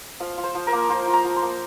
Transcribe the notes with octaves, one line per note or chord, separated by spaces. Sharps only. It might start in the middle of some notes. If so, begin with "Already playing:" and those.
F3 F5
F4
C5
F3
A#4
A#3
F3 C5
F4
A#5
F3
C6
A#3